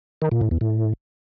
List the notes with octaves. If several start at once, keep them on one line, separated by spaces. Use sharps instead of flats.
D#3
A#2
A2
E2
A2